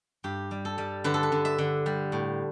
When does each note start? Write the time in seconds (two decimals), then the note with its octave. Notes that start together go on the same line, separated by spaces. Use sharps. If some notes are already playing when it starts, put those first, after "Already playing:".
0.24 G2 G4
0.51 G3
0.65 A4
0.78 G3
1.04 D3 B4
1.14 A4
1.23 B4
1.32 D3
1.45 E5
1.58 D3
1.86 G3
2.12 A2